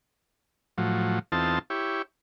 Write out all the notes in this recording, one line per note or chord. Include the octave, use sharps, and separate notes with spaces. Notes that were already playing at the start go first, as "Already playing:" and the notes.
A2 F3 F#3
E2 C4 D#4 F4 A4 A5
E4 G4 C#5